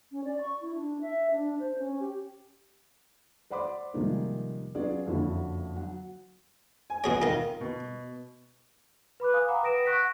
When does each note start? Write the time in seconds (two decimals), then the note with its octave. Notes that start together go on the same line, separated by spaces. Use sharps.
0.12 C#4
0.25 D5
0.41 C#6
0.61 E4
0.75 D4
1.01 E5
1.31 D4
1.60 C5
1.79 C#4
2.00 G4
3.50 C5 D5 F#5 B5 C6 D6
3.94 C3 D#3 F3 G3 G#3 A#3
4.75 F#3 B3 C#4 F4 G#4 D5
5.06 F#1 F2 D3 E4 F#4
5.76 F#3 F#5
6.90 G#5
7.04 B2 G#4 C#5
7.22 D#3 D#4 F4 A#4
7.61 B2
9.20 B4 B5 D6 F#6
9.33 F5 G#5 D#6
9.48 F#5 G5 A#5 B5 D6
9.63 B4 D#6 A#6 D7 E7
9.85 F#5 C#6 F#6 A#6 B6 D7
9.97 F#5